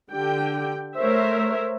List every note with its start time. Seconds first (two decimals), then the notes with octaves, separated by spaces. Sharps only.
0.11 D3 G4 G5
0.98 A3 A#4 C5 C#5 E5